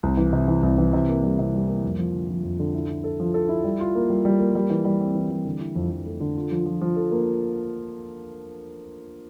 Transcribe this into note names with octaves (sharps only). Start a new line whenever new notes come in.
C2
E3
C3
E3
C2
E3
C3
A#3
G3
C3
G3
A#3
F2
F3
D3
F3
F2
D3
E4
E4
A4
F3
A4
E4
G3
F4
A#3
G3
G3
A#3
G3
E3
G3
C4
E3
G3
D3
E4
F2
F2
A3
D3
F4
F3
F3
F3
A4
A#3